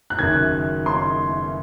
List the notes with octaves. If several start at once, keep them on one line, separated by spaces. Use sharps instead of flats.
F#6
F#1 F#2 D#3 G#6
C6